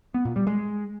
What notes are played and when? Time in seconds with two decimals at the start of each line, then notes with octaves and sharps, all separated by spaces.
0.14 B3
0.25 A#2
0.36 G3
0.47 G#3